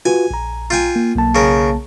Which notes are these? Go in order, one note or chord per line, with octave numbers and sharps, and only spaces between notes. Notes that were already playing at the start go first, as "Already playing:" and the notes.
F4 F#4 B4 G#5
A#1 A#5
F4 G5 G#5
A#3
B1 A#3 A5
C#3 A#4